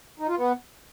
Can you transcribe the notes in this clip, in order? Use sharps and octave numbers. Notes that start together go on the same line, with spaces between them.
D#4
F4
B3